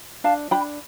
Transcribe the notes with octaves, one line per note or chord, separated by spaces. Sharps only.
D4 F5 A5
D4 G5 B5